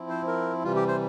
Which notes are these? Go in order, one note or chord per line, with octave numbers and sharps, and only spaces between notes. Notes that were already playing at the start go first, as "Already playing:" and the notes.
Already playing: F3 C4 E4
C5
A#4
C3 E3 G3 F4
G4
C5